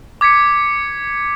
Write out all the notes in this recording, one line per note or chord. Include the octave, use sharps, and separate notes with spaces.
D6 G#6 B6 C#7